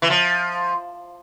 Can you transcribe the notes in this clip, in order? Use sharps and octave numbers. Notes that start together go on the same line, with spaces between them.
E3
F3